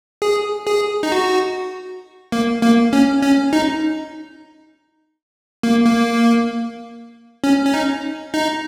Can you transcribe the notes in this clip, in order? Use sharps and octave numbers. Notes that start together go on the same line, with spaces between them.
G#4
G#4
D#4
F#4
A#3
A#3
C#4
C#4
D#4
A#3
A#3
C#4
C#4
D#4
D#4